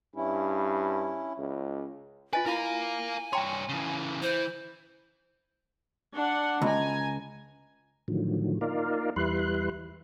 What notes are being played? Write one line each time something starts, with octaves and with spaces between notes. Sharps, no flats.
G2 C#4 E4
C#2
F4 B4 D#5 G#5
E4 F4 A#4 F5 G#5
G2 C#5 G5 A#5 C6
C#3 E3
E3 C5
D4 F#5
C#2 G#5 A#5
A2 D3 D#3 F3 F#3
A#3 D#4 F4 A#4 D5 F5
E2 G3 E4 B4 C6 F#6